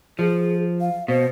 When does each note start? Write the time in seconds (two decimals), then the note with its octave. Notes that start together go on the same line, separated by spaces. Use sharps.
0.19 F3 G#4
0.81 F5
1.08 B2 C5